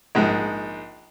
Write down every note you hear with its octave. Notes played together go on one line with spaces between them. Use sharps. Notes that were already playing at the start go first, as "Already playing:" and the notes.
A#1 G#2